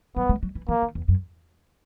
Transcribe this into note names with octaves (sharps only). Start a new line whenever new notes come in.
F#3 B3
G#3
F#3
E3
E3 A#3
D#3
E2
F#2